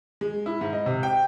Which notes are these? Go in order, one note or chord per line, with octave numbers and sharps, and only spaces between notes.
G#3
E4
G#2
D#5
C3
G5